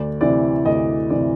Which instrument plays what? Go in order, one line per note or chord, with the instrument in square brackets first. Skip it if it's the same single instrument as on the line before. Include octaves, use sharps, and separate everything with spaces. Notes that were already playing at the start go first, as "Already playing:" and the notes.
Already playing: [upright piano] D2 D5
C3 E3 D5
D2 D#5
C3 E3 D5